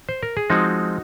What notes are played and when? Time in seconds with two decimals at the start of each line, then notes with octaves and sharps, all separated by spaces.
0.09 C5
0.23 A#4
0.37 G#4
0.50 F3 G#3 C4 D#4 F#4